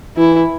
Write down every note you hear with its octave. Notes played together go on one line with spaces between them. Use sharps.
E3 E4